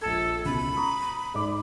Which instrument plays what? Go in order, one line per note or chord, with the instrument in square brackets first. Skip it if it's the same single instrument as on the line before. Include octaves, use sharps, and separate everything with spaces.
[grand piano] A#1 G#6 [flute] A4
[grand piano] C#2 B2 [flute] B5
[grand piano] A#5 C#6 D#6
G#2 D5 D6